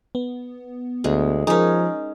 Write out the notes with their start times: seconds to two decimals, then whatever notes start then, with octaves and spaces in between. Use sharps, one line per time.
0.15 B3
1.04 D2 G#3
1.47 F3 C#4 D#4 G#4 A#4